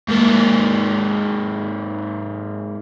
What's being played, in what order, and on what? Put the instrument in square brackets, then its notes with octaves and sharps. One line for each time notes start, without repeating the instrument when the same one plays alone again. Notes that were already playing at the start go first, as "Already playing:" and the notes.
[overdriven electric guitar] G#2 A#3